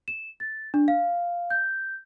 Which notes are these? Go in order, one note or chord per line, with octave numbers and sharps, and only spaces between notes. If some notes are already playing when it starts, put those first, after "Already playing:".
E7
A6
D4
F5
G6